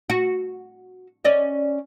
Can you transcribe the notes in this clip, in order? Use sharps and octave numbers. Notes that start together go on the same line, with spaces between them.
F#4
C#4 D5 D#5